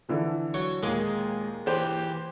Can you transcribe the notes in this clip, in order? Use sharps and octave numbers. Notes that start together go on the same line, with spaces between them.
D3 E3 F3
F#3 F#4 C#5
D#2 A#2 G#3 A#3 G#4
E3 G4 C5